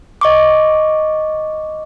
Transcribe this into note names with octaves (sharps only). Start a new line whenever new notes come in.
D#5 C#6 D6